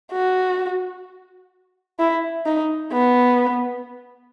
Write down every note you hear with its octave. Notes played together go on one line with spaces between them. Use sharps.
F#4
E4
D#4
B3